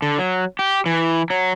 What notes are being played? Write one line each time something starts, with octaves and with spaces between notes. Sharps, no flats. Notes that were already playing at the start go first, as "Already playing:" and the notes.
D3
F#3
G4
E3
F#3